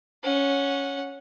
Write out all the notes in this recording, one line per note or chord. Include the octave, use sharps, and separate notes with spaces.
C#4 F#5